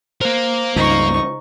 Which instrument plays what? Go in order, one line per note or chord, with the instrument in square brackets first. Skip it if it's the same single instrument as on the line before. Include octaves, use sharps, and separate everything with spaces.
[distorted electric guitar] A#3 A#4 [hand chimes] C5
[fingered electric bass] C#2 G2 [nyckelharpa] D#4 C#6